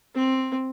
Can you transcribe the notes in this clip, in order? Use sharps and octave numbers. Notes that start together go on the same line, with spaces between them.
C4